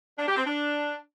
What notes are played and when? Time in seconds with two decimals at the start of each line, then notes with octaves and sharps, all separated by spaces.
0.18 D4
0.27 G4
0.36 C4
0.45 D4